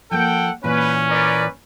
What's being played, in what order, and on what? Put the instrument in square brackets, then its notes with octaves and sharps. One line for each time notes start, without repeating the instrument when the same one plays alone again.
[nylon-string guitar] F3 A#3 [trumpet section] A4 F#5 G5
[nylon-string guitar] A#2 E3 [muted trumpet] C#4 [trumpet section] B4
[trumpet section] A#4 B4 D5